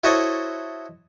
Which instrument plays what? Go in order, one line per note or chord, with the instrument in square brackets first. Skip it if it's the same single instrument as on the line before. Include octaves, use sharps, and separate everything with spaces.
[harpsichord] E4 F#4 A4 C5 C#5 D#5